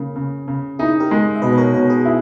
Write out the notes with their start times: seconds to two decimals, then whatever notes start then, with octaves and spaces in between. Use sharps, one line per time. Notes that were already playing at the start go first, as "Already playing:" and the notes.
Already playing: C#3 A#3
0.16 C#3
0.48 C#3
0.79 D#4 E4 G#4
1.00 G4 A#4
1.11 G#3
1.35 E5
1.42 B2 B4 D#5
1.52 B4
1.58 A#4 C#5
1.74 B2 A#4 C#5
1.89 G#4 B4
2.05 E4